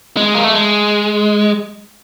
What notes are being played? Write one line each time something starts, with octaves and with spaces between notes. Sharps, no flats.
G#3
A#3
A3
G#3